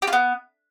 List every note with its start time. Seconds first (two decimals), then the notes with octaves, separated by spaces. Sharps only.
0.02 G4
0.07 F4
0.13 B3